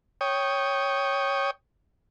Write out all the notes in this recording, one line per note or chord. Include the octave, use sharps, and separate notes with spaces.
C#5 G5 D#6